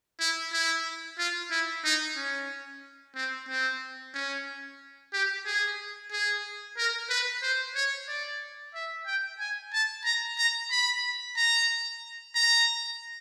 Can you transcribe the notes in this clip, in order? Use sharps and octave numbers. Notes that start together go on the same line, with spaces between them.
E4
E4
F4
E4
D#4
C#4
C4
C4
C#4
G4
G#4
G#4
A#4
B4
C5
C#5
D5
E5
G5
G#5
A5
A#5
A#5
B5
A#5
A#5